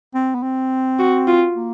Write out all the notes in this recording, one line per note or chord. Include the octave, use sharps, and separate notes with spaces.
C4
B3
C4
F#4
F4
A#3